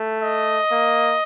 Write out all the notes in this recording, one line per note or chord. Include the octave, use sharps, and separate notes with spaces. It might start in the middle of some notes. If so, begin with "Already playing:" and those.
Already playing: A3
D#5
A#3